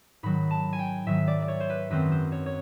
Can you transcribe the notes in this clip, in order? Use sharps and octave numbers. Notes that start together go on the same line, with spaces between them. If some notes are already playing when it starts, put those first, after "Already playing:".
G#2 D#3 F#3 B5
A5
G#5
G5
G#2 D#3 F#3 E5
D5
D5
C#5
C5
B4
F#2 D#3 G#3 C4 B4
C5
C#5
C#5